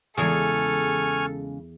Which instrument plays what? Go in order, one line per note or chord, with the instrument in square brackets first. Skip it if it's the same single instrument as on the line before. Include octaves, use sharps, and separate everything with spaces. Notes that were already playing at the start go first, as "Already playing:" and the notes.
[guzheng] E2 G#4 [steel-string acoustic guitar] C#3 G#3 [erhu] A4 [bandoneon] G#5 C#6 F6